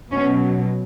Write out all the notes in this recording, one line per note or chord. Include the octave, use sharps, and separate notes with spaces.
B2 F#3 C#4